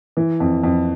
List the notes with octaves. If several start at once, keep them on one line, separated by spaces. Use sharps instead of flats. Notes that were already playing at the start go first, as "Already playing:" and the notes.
E3
F2
F2